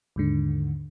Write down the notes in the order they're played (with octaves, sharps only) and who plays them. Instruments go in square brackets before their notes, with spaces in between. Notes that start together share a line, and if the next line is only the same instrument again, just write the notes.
[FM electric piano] D#2 G#2 D3